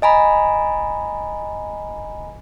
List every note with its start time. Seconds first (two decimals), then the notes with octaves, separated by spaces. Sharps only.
0.02 D#5 G#5 A#5 B5